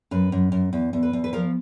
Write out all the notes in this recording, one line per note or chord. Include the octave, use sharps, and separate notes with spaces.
F#2 B4
F#2
F#2
E2
E2
B4
E2
B4
F3 A#4